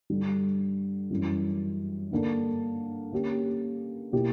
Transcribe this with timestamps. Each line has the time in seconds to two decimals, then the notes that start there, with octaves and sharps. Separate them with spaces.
0.10 G2 D3 G3
1.11 F#2 E3 G3
2.11 G2 D3 A#3 D4
3.12 D3 A#3 C#4 G4
4.12 B2 A#3 E4 G4